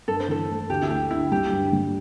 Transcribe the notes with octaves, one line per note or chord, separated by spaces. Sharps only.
G2 A4
C5
E3 A4
A3
D2 G4
E4
A3 G4
D3 E4
G3 G4
G2
G3